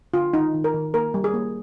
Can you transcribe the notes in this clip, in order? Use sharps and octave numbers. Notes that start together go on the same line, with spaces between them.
D3 F4
D#3 D#4
D#3
A#4
D#3
A#3 A#4
G3
G#4
A#3